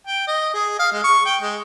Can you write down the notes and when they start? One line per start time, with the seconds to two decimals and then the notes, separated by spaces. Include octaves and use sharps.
0.07 G5
0.27 D#5
0.54 G#4
0.79 F5
0.92 G#3
1.04 C#6
1.25 G5
1.42 G#3